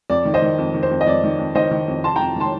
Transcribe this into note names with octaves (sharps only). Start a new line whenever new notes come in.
F2 D5
D#3
C5 D#5
D#3
F2
D#3
C5
F2
D#5
F2 D5
D#3
F2
D#3 C5 D#5
D#3
F2
C3 A5 C6
F2 G5 A#5
D#3 A5 C6